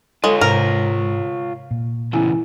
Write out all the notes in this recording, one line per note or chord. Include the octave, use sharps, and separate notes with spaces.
G#3 F4 A4 C#5
G#2 C3 A#4
A#2
E2 C#3 E4 G#5